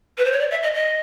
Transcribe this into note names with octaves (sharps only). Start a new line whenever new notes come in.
B4
C5
C#5
D5
E5
D#5
D#5